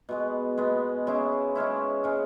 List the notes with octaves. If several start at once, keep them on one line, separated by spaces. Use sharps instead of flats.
B2 G#3 B3
B2 G#3 B3
C#3 G#3 C#4 E4
C#3 G#3 C#4 E4
C#3 G#3 C#4